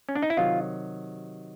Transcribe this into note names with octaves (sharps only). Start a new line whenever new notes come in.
C#4
D4
D#4
E4
C3 D#3 F#3 F4